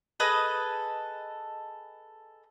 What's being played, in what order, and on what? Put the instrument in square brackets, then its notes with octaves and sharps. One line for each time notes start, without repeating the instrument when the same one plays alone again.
[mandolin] G#4 A4 B4 D#5